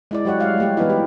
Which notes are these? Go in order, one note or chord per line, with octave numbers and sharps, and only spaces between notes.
G#3 E4 D5
F#3 G4 C#5 F#5
G3 G#3 F5 F#5
G#3 A3 G4
E3 B3 D#4 E4
G4